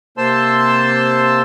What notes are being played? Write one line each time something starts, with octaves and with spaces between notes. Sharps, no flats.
C3 A#3 C5 A5 C6 E6